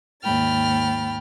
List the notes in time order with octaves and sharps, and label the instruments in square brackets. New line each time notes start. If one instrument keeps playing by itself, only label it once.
[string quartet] D#2 G#2 G5 B5 F6 A6